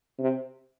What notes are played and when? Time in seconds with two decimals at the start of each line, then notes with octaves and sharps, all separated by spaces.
0.19 C3